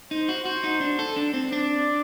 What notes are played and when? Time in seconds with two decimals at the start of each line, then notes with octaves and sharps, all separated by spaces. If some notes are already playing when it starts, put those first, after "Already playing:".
0.11 D#4 C5
0.29 F#4
0.45 F#4
0.64 D#4
0.81 D4
0.99 A4
1.16 D4
1.34 C4
1.52 D4 D5